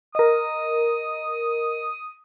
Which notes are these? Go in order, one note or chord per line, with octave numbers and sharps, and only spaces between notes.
A#4 D#5 D#6